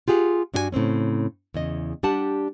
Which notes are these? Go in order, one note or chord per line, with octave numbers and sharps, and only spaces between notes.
F4 G4 G#4 F#5
G2 D4 F#4 G#4 G#5
A2 C#3 C4 C#4
E2 C#3 D#5
G3 D4 G4 F#5 A5